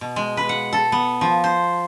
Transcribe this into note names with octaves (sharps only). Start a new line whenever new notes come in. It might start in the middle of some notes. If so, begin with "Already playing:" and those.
B2
G#3
B4
F#5
A4
B3
F3
C5